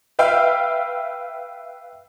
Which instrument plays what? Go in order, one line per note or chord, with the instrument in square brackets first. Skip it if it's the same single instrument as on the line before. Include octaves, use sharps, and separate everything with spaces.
[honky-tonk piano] B4 E5 F5 G5